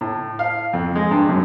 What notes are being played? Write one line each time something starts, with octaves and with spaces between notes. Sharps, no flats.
A2
F5
F2
G#3
G2
F#2